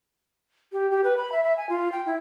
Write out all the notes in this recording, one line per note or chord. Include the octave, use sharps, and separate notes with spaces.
G4
G4
B4
B5
E5
E5
G#5
F4
G5
E4